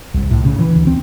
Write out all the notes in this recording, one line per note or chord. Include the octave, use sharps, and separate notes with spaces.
C2
A2
C#3
E3
D2
C4